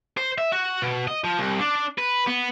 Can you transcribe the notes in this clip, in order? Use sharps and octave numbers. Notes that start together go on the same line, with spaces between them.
C5
E5
F#4
B2
D#5
F3
C2
D4
B4
B3